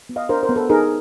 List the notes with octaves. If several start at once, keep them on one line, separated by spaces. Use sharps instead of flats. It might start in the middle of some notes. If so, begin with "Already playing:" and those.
B3
D#5 F5
D4 A#4 C5
A#4 C5
B3
A4 B4
D#4 G#4 A#4